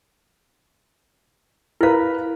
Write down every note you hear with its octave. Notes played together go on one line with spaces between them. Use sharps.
E4 A#4 B4 F5